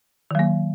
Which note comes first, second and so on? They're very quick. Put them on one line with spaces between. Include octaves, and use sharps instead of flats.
D#3 F#3 A#3